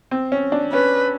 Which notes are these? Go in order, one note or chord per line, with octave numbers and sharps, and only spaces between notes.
C4
C#4
D4
C#4 B4